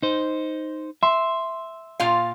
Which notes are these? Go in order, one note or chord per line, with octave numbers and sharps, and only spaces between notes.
D#4 C5
E5 C6
A#2 F4 F5